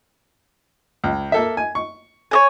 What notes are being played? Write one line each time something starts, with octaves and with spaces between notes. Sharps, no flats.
C#2
A#3 A4 E5
G#5
C#6
C#5 D#5 G#5